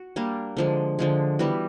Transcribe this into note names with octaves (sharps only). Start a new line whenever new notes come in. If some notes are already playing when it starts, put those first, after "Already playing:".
Already playing: F#4
G3 A#3 D4
D3 F3 G#3
D3 F3 G#3
E3 G3 B3 F#4